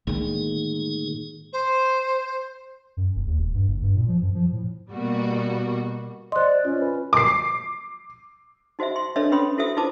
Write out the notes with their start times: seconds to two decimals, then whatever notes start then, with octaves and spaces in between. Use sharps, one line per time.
0.07 A2 D3 D#3 G#3 A#3 D#4 G#4
1.52 C5
2.97 F#2
3.16 F1
3.27 D#2
3.39 E1
3.54 G2
3.68 F#1
3.83 G2
3.96 A#2
4.08 F3
4.22 F#2
4.35 F3
4.52 A2
4.91 B2 G3 A#3 F#4
6.32 C5 D5 D#5 C6 F#6
6.65 C#4 F4
6.82 B4
7.13 D6 C7
8.79 D#4 F#4 C5 D#5 E5
8.96 C6
9.16 D4 A4 B4 C#5 D#5 E5
9.32 C#4 B4 C#5 B5 C6 D#6
9.58 E4 F#4 A4 C5 E5 D#6
9.77 D#4 F4 B4 C5 A5 D6